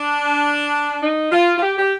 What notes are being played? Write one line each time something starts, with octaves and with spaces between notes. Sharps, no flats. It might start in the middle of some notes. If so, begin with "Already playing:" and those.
Already playing: D4
D#4
F4
F4
G4
G4